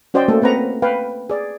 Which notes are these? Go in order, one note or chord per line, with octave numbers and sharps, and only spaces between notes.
C#4 F#4 C5 D5 D#5 G5
A3 A#3 A4
A#3 C4 B4 F#5 A#5
B4 F5 G5
G#4 D5